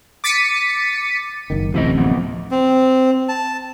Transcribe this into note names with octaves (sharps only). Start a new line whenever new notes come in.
D6 A6 B6 C#7 D#7
F#1 D#3
D1 A1 C3 F3 E4 D#5
F3 B3
C4
A5